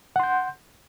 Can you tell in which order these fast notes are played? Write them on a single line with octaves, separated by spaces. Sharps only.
F#5 C6 G6